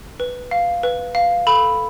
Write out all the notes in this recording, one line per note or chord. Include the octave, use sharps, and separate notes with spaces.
B4
F5
B4
F5
A4 B5